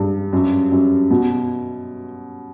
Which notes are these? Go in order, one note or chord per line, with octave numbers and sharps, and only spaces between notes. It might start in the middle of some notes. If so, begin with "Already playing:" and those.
Already playing: G2
F#2
F#2
B2